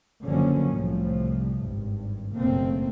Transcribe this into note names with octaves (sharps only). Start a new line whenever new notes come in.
F#1 D3 F3 F#3 A#3 C#4
C2 A2 F3
G#1 G2
F#1 B2 A3 A#3 C4